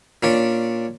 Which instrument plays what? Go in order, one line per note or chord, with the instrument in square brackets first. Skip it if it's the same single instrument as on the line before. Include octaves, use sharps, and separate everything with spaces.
[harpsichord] A#2 C#4 D4